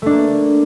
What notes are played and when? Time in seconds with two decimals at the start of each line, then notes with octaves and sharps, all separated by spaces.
0.02 A3
0.06 D4
0.10 A#3